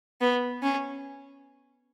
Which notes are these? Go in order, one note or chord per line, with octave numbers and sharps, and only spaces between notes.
B3
C#4